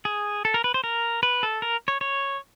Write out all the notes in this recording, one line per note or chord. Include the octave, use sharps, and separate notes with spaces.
G#4
A4
A#4
B4
C5
A#4
B4
A4
A#4
C#5
C#5